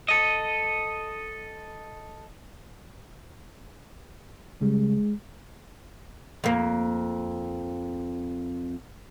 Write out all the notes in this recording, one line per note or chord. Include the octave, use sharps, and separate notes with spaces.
A4 D#5
C#3 G3 G#3
F2 A#3